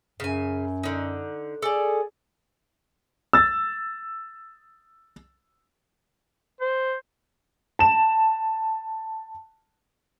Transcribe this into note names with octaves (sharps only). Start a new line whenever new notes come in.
F#2 C#3 G#5
D3 D#4
G#4 A4 D5
E6 A6
C5
A5 E7